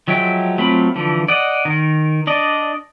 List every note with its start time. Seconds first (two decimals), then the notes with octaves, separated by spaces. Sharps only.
0.08 F3 F#3 G#3 E5 G5
0.58 F#3 A3 C4 F4 B5
0.96 D3 E3 F3
1.28 D5 D#5 F#5
1.65 D#3 A#4
2.27 D4 D5 D#5